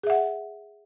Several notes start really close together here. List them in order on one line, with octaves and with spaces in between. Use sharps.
G#4 E5 F#5